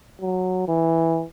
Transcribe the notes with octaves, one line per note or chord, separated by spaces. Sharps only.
F#3
E3